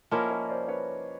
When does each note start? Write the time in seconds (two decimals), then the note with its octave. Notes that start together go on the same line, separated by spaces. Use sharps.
0.11 F3 A#3 C#4 E4 C#5 D#5
0.31 C#5 D#5
0.49 C5 D5
0.68 B4 C#5